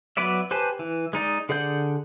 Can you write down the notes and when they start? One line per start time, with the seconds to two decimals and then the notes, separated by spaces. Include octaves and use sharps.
0.17 F#3 B3 B4 D5 E5
0.51 G4 B4 C5 G#5 A5
0.79 E3
1.13 G#3 D#4 D5
1.49 D3 G#4 D5 F#5 G6